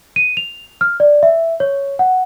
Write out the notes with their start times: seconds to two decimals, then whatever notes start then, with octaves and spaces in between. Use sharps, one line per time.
0.16 D#7
0.37 F7
0.81 F6
1.00 D5
1.23 E5
1.60 C#5
1.99 F#5